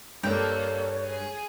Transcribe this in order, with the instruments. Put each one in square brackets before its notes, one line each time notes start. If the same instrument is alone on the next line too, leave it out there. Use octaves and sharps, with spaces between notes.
[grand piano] G2 [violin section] A#3 A4 [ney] C#5 [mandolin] G5
[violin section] G#4